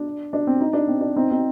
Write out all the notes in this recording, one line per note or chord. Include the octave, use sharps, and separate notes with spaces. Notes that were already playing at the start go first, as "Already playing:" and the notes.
Already playing: D4
D4
C4
D#4
D4
C4
D4
C4 D#4
C4 D#4